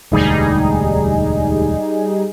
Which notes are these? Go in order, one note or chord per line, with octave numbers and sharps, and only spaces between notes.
E1 D2 G#2 G3 D#4 G#4